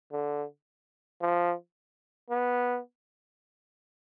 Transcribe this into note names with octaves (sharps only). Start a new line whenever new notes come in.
D3
F3
B3